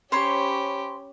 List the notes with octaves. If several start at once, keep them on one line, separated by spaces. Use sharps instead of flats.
C#4 G4 C5 C#5 B5